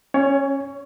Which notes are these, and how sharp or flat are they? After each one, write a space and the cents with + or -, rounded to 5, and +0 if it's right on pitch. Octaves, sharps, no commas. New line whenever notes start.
C#4 -15 C#5 +20